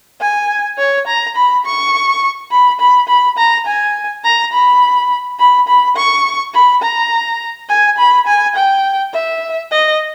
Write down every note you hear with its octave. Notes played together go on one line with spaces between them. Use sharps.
G#5
C#5
A#5
B5
C#6
B5
B5
B5
A#5
G#5
A#5
B5
B5
B5
C#6
B5
A#5
G#5
B5
G#5
G5
E5
D#5